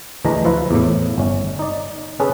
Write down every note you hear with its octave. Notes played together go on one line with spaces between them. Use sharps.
D2 E3 D4 G#4 D#5 A#5
F3 E4 F4 B4
E2 A2
G1 C#4
D#4 D5
C#4 G#4 A4 B4